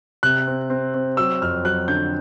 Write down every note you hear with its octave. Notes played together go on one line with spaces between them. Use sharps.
C3 F#6
C4
C4
C4
F#3 E6
F2 F6
F#3 F#6
D3 G6